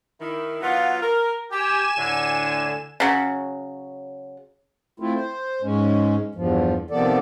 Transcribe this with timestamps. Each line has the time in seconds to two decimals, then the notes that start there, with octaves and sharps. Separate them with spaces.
0.20 D#3 E4
0.62 F#3 B3 F4
1.02 A#4
1.51 G4 G#5 E7
1.97 D2 A2 D3
3.00 C#3 F#3
5.00 A3 C4 E4 F4
5.15 C5
5.62 G#2 G#3 C#4
6.35 E2 G2 F3
6.90 C3 D#3 F3 B3 A4 D5